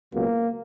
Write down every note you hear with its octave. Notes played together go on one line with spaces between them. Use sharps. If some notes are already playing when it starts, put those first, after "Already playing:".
C#2 B2 F#3 A#3